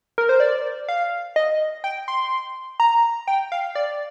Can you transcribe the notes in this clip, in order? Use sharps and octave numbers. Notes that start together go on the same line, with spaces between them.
A#4
C5
D5
F5
D#5
G5
C6
A#5
G5
F5
D5